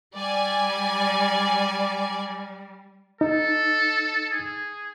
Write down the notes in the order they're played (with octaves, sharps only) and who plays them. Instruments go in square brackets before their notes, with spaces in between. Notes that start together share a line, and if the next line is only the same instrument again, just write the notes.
[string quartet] G3 [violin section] D5 G#5
[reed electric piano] D#4 [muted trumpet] A4
[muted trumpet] G#4